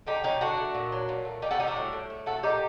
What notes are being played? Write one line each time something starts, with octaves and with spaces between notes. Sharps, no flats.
D3 D#4 G4
F#3 D#4 G4
D3 D4 F#4
A3
A#2
F#3
A#2
A3
G3 D#4 G4
F#4 A4
G3 D#4 G4
D4 F#4
A2
A2
A3
A3 F#4 A4
A#2 D#4 G4